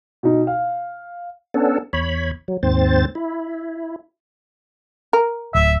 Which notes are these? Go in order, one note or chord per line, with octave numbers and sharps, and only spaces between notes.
B2 D#4
F5
B3 C#4 D4 A4
E2 C#5 B5
F#3
D#2 G#2 C4 C5 A6
E4
A#4
D1 E5